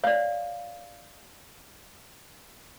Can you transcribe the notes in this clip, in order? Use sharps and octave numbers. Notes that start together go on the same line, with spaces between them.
C#5 D5 F5